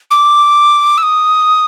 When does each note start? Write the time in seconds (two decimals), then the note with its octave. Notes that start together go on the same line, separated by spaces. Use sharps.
0.11 D6
0.98 E6
1.03 D#6